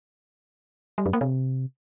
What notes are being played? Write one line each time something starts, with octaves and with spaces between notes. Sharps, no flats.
G3
F#2
A#3
C3